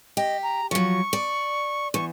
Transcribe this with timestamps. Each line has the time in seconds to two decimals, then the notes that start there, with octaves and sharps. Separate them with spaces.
0.17 G4 D#5
0.43 A#5
0.71 F3 F#3 C#6
1.13 D5
1.94 E2 C#6